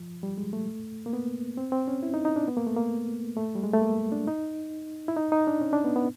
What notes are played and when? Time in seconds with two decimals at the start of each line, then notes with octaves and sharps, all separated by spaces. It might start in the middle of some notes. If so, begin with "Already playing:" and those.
Already playing: F3
0.23 G3
0.38 G#3
0.53 A3
1.06 A#3
1.13 B3
1.57 C4
1.72 C4
1.88 C#4
2.03 E4
2.14 D#4
2.25 D#4
2.36 D4
2.48 B3
2.57 A#3
2.67 A3
2.76 A#3
3.37 A3
3.55 G3
3.64 G#3
3.74 A3
3.82 A#3
4.12 D4
4.27 D#4
5.08 E4
5.17 D#4
5.32 D#4
5.47 D4
5.61 C#4
5.73 D4
5.84 B3
5.96 B3